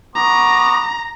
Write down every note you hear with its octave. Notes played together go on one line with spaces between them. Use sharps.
B3 A#5 C#6 D6